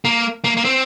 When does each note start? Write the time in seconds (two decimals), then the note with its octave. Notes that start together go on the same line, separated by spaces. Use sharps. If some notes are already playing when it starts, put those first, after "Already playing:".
0.05 A#3
0.44 A#3
0.57 A#3
0.65 C4